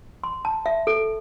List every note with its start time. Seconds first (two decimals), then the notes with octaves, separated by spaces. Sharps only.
0.24 C6
0.45 A5
0.66 E5
0.87 A4